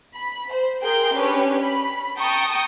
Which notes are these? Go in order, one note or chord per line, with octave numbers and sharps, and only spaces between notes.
B5
C5
G#4 A#4 G5 C6
C#4 D4 G4 B4
B5
G5 A5 A#5 C#6 D#6